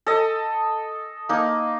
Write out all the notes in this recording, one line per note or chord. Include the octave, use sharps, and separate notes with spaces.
A4 D#5
A#3 D#4